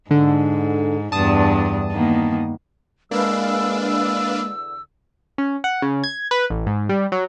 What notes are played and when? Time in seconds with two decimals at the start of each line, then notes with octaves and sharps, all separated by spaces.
0.11 G#2 D3
1.12 E2 G2 D4 A5 D#6
1.92 D#3 A#3 B3
3.11 E2 D3 G#3 A#3 D4 B4 F5 E6
5.38 C#4
5.64 F#5
5.82 C#3
6.04 G#6
6.31 B4
6.50 A1
6.66 G#2
6.89 G3
7.12 F#3